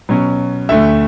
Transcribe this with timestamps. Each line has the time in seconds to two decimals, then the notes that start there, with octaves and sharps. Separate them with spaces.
0.09 B2 F#3 C#4
0.69 D2 D3 A3 E5